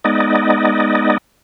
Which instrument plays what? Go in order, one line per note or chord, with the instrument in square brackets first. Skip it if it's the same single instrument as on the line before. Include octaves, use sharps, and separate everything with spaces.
[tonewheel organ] G#3 B3 D#4 D5 D#5